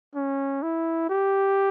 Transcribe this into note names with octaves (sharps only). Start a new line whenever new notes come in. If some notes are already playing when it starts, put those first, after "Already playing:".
C#4
E4
G4